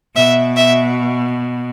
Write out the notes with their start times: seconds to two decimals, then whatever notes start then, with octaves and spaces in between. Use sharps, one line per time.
0.15 B2 E5
0.57 E5